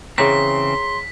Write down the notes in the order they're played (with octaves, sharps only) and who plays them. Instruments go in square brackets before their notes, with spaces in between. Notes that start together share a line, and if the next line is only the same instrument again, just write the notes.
[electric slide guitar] C#3 E3 C4 [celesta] G#4 C#5 A#5 [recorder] C6 [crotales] B6